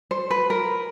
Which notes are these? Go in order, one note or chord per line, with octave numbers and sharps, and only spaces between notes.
C5
B4
A#4